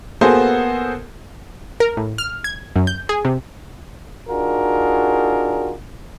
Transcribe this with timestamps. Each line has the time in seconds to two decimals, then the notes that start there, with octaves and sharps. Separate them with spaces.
0.21 A#3 B3 F#4 G#4 A4 C5
1.80 A#4
1.97 A2
2.18 F6
2.44 G#6
2.76 F#2
2.87 G6
3.09 G#4
3.25 C3
4.29 D4 D#4 F4 F#4 G#4 A#4